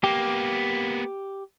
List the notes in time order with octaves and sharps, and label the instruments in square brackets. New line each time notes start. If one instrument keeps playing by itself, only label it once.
[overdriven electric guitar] A#3 B3 [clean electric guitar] G4